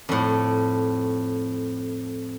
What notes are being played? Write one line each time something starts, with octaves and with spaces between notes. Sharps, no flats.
F2 A2